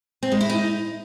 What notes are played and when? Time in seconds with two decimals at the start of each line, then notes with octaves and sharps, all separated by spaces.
0.23 C4
0.32 G#3
0.41 E4
0.50 D#4